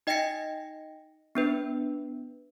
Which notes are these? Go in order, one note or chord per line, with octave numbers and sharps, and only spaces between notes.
D#4 D#5 G5 A6 A#6 C#7
B3 D4 B4